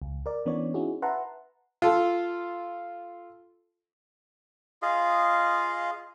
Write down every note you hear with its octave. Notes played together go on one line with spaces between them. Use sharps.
C#2
A#4 D5
E3 B3 C#4 D4 C#5 D5
C#4 D#4 E4 F#4 G#4
B4 E5 F#5 A5 A#5 C6
F4 A4
F4 G#4 D#5 F5